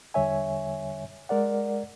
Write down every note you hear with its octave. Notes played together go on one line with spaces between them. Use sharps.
E2 D3 G3 C#5 E5 G#5
G#3 A#4 D5 F#5